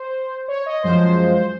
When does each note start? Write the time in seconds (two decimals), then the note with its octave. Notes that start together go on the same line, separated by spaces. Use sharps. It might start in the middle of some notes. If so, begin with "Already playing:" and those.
Already playing: C5
0.48 C#5
0.66 D#5
0.83 F#2 F3 G#3 C5